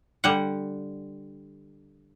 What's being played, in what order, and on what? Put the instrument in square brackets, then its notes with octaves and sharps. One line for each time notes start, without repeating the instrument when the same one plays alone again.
[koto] D3 G3 F#5